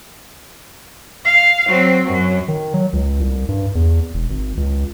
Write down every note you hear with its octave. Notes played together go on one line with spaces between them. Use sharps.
F5
F#3 C4
F#2 F#3
D#3
F#3
C#2
C2
G2
E2
E1
G#1
C#2